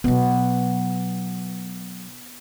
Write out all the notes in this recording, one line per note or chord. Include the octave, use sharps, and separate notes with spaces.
B2 F#3 B3